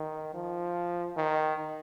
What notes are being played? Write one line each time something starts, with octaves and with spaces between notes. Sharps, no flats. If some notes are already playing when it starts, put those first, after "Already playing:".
Already playing: D#3
F3
D#3